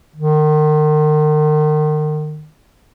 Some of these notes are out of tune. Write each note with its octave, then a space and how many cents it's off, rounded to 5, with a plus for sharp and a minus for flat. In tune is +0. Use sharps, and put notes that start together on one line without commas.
D#3 -35